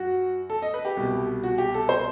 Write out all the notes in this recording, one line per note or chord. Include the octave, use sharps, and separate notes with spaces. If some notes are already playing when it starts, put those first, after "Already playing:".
Already playing: F#2 F#4
A4
D#5
B4
G4
C2 B2 G3
F#4
G4
A4
C5